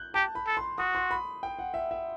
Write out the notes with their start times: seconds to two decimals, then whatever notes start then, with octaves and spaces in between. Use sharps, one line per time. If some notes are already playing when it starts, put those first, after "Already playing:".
Already playing: F#6 G6
0.14 G4 A5
0.35 B5
0.47 A4
0.57 C6
0.78 F#4 D#6
0.95 C6
1.11 B5
1.43 G5
1.59 F#5
1.74 E5
1.91 E5